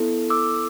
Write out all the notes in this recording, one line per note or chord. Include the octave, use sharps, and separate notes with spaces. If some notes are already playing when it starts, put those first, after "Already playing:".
Already playing: B3 E4 A4
D6 E6